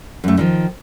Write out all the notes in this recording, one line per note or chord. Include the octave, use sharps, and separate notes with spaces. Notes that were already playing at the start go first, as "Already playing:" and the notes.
F#2 A3
D3 D#3 F3